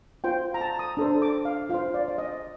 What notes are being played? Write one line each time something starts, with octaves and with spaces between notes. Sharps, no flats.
F4 C5 G5
A#5
A5
D#6
D4 A4 C5
D6
F5
F4 C5 F5
D5
D5
D#5